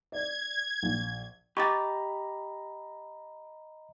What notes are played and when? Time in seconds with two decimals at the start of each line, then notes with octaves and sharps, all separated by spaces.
0.12 D5 G#6
0.83 A#1
1.57 G4 D#5 A#5 B5 C#6 D6 A6